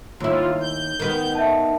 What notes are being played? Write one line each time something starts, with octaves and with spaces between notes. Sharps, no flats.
D#2 E4 F4
G6
D#3 B3
E5 A5